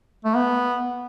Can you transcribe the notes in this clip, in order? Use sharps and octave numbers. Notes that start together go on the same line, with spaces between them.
A3
B3